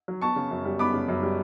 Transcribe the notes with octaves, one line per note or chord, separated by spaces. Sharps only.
F#3
B3 A5 C#6
C#3
F#2
G3
B3 B5 D6
C#3
F#2
G3